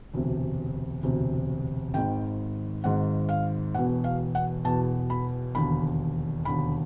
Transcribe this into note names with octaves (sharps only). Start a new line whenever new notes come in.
E1 D2 C3
E1 D2 C3
G#1 G#2 D#3 G5
G#1 G#2 D#3 F#5
F5
E1 E2 B2 F#5
F5
F#5
E1 E2 B2 A5
B5
E1 D#2 D3 B5
E1 D#2 D3 B5